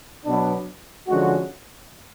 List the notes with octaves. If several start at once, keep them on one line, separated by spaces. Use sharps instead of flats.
B2 F#3 B3 D4
D3 F3 G#3 C#4 F#4